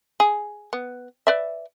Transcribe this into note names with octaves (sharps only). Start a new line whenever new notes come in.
G#4
B3
B4 D5 E5